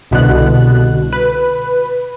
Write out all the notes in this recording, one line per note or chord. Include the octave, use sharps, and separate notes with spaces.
C2 B2 D3 F#6
B4